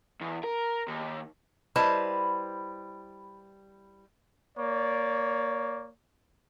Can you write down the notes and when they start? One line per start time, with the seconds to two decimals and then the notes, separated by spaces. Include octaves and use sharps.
0.21 E2
0.44 A#4
0.88 D#2
1.76 G3 E4 B4 C5 D#5 A5
4.58 A#3 C#5 D5